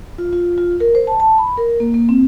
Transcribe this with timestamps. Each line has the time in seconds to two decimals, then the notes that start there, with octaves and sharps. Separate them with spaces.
0.18 F4
0.33 F4
0.58 F4
0.80 A#4
0.95 C5
1.07 A5
1.20 A5
1.38 B5
1.57 A#4
1.80 A#3
1.94 A#3
2.09 C4